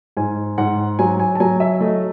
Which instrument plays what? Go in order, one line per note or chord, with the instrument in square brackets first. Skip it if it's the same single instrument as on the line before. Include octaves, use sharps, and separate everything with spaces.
[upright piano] G#2 G#5
G#2 F#5
F#3 G#5
G#5
A5
F#3 G#5
E5
A3 D#5